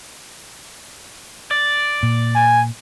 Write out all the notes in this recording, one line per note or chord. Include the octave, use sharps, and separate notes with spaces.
D5
A#2
G#5